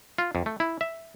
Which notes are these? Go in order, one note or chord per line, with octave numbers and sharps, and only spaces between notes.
F4
F2
A3
E4
E5